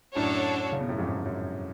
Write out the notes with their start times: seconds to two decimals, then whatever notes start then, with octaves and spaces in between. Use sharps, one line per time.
0.16 F#2 A2 D4 F#4 A4 C#5
0.72 C#3
0.81 B2
0.89 F#2 A2
0.98 F2 G#2
1.07 F#2
1.17 F2
1.26 F#2